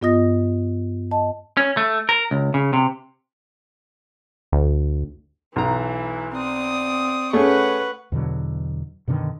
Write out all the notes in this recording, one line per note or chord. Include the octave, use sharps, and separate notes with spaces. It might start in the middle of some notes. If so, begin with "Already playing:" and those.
G2 B3 F4 D#5 D#6 A#6
D#5 A5
C#4
A3
A#4
C#2
C#3
C3
D2
B1 E3 A#5
C4 D5 D#6
A3 C#4 G#4 B4 F#5 C#6
E2 B2 D3 F#3
F#2 B2 D3 D#3